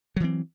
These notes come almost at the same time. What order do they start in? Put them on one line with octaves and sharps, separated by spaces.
F#3 E3 C4